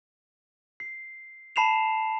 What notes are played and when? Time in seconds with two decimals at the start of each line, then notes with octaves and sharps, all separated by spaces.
0.80 C7
1.56 A5 B5 C7 E7 F7